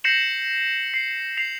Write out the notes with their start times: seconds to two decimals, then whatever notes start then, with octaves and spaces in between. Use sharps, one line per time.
0.04 G6 A#6 C7 C#7 E7 F#7
0.94 C7
1.37 C7 F7